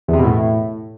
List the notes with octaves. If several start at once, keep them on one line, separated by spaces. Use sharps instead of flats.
E2
C3
B2
A2